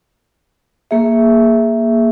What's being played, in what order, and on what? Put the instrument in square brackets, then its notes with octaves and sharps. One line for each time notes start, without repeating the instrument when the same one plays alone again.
[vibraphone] A#3 G#4 E5